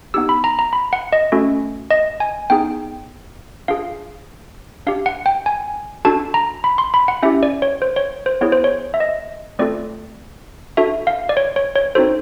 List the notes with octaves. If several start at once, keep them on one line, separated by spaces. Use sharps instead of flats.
B3 D#4 G4 E6
B5
A#5
A#5
B5
F#5
D#5
A3 C#4 F#4 A4
D#5
G#5
B3 D#4 G#4 G5
D4 F4 G#4 F5
D4 G4 F5
F#5
G5
G#5
D4 F#4 A4 A5
A#5
B5
C6
B5
F#5
C#4 E4 G4 E5
D5
C#5
C5
C#5
C5
B3 E4 G#4 C#5
C5
C#5
E5
D#5
A3 C4 F4 A4 D5
D4 F#4 A4 E5
F5
D5
C#5
C#5
C#5
C4 D#4 F#4 A4 C5